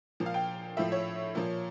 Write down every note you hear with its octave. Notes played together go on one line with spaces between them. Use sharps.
A#2 F3
F5
G5
A2 F3 E5
C#5
A#2 F3